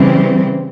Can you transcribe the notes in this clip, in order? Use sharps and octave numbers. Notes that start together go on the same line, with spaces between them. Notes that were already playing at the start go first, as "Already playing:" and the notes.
Already playing: C#3 E3 G3 C4